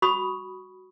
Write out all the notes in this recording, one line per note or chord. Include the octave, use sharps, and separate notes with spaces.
F#4 B5 C#6 D#6